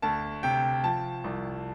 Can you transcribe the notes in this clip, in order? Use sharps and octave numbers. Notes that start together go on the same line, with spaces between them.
D2 A5
C3 G5
F3 A5
C2